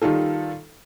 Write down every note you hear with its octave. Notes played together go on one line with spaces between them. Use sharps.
D#3 G3 D#4 F4 A4